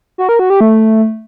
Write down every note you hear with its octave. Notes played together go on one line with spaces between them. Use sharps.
F#4
A#4
F#4
G4
A3